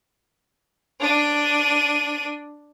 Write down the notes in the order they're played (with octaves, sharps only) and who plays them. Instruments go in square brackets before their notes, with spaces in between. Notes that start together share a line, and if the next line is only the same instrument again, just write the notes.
[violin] D4 D#7